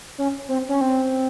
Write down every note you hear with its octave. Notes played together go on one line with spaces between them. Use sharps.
C#4
C4
C#4
C4